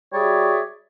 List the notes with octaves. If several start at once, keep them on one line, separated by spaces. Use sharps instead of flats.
G3 F#4 G#4 C#5 D5 E5